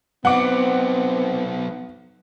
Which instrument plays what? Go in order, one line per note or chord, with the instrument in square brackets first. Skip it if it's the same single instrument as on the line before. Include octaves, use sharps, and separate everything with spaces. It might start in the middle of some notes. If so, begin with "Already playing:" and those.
[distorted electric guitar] F#3 D#4 [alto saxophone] B3 [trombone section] C4 [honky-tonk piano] F#5 D6